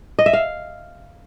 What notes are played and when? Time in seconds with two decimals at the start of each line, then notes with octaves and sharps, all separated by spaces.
0.19 D#5
0.26 E5
0.33 F5